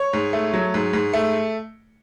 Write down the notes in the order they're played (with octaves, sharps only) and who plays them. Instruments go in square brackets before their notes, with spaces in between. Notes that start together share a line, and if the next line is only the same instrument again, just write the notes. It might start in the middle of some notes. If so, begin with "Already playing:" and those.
Already playing: [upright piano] C#5
G#2
A3
F#3
G#2
G#2
A3